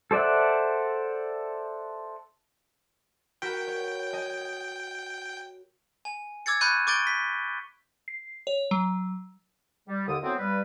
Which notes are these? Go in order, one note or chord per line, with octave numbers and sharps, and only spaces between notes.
A4 C5 D5 E5 F#5
F#4 A#4 B4 G5
C#5
D#5 G#5 G#6
G#5
D6 E6 G#6 A6 C#7
B5 C#6 F#6 G6 C#7 D#7
C#6 D6 G6 A6 D7 G7
B6
C7
C#5
F#3
G3
D#2 D3 D#6
A2 F#3 B3 C4
G2 G3 B4